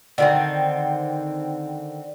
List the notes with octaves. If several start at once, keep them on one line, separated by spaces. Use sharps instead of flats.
D3 D#3 C4